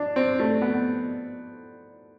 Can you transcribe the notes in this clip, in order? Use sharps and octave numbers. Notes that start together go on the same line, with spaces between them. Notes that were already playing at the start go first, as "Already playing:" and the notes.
Already playing: D4
C4
A3
B3